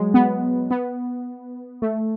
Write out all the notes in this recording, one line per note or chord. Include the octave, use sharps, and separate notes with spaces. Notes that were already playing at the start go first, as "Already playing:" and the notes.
Already playing: F#3 G#3
B3
B3
A3